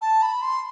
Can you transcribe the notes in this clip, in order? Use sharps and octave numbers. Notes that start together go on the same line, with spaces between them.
A5
B5
C6